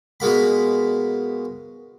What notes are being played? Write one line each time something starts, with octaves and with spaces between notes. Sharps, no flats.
B2 G#3 A#3 B5